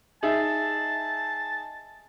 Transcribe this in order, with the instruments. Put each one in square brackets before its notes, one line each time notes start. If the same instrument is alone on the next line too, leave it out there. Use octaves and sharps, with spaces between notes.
[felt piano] D#4 G#4 E5 [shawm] A5